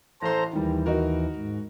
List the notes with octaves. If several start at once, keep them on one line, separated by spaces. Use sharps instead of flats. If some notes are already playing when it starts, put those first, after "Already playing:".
A1 A4 C5 A#5 C6
D#2 D#3 E3 G3
D#4 F#4 A#4
G#2